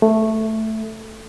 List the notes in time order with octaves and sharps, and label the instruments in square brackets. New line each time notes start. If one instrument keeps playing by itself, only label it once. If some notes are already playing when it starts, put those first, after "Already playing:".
[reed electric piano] A3